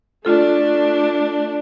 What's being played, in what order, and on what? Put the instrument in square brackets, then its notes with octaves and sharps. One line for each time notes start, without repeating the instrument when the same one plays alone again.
[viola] A3 D4 [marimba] F4 A4